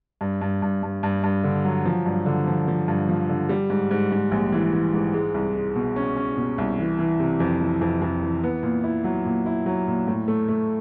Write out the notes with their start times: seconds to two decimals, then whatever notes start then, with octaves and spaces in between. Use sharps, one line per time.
0.21 G2
0.41 G2
0.62 G2
0.83 G2
1.03 G2
1.24 G2
1.44 D3
1.65 F#3
1.85 F3
2.06 G2
2.26 D3
2.47 F3
2.68 F3
2.88 G2
3.09 F3
3.29 D3
3.49 G3
3.70 G#2
3.91 G#2
4.12 G#2
4.31 A#1
4.52 E3
4.73 E3
4.94 G#2
5.14 G#3
5.34 C2
5.55 G#3
5.76 B2
5.96 C#4
6.16 C#4
6.37 B2
6.58 C2
6.79 E3
6.99 E3
7.20 C3
7.40 F2
7.60 E3
7.81 F2
8.02 F2
8.23 E3
8.43 B3
8.63 A#2
8.84 E4
9.04 F#3
9.25 A#2
9.46 E4
9.66 F#3
9.87 A#2
10.07 A2
10.28 A3
10.49 A3